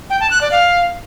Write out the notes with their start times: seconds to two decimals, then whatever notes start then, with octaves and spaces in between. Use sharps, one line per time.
0.10 G5
0.20 A5
0.31 F#6
0.41 D5
0.52 F5